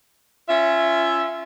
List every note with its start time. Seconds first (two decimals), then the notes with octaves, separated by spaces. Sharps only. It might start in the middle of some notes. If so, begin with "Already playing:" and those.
0.49 C#4 F4 E5